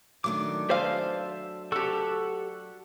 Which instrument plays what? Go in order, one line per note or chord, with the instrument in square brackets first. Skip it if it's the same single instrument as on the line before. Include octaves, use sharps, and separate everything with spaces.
[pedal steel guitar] D#3 D6 [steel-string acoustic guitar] F#3 A3 D4
[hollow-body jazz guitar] C5 F5 [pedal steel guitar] E5 A5 C6 [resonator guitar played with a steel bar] G#5
[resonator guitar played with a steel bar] G4 A4 [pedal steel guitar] F#5 A5 C#6